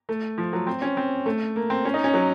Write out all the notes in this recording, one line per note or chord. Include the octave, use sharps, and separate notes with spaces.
A3
F3
F#3
C4
C#4
C4
A3
A#3
C4
C#4
D#4
C#4
F#3